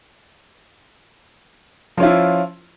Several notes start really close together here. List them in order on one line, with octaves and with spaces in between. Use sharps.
F3 C#4 F4 E4